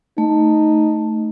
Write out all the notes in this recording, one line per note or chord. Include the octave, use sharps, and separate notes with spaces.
A3 D#4